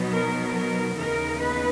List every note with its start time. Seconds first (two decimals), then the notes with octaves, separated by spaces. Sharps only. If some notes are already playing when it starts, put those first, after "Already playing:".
Already playing: B2 F#3 B3 D#4
0.12 A#4
0.55 A#4
0.97 D#2 C#3 E3 B3 D#4 A#4
1.40 B4